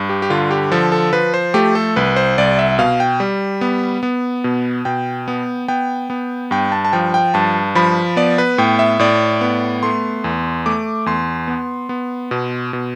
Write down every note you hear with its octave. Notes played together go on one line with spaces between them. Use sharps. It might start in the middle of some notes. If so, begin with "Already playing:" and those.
Already playing: G2
G4
G4
D3 F4
G4
F3 A4
A4
F3 B4
C5
A3 G4
A4
C2 B4
C5
C2 D5
E5
B2 F5
G5
G3
B3
B3
B2
B2 G5
B3
B3 G5
B3
G2 G5
A5
A5
F3 G5
G5
G2 A5
F3 B5
B3 D5
B4
A2 G5
E5
A2 D5
B3
A3 C6
E2
A3 D6
E2 C6
B3
B3
B2
B2